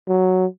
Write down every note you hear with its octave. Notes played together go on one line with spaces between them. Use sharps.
F#3